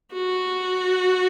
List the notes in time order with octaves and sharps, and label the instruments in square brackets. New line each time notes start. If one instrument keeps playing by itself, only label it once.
[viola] F#4